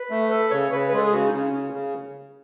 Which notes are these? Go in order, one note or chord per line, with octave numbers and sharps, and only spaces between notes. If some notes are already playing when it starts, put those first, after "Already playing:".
Already playing: B4
A3
A4 B4
C#3 C#5
C#3 B4
G#3 B4
A4
G#4
C#3 F#4
D#4
C#3 C#4
C#3
C#3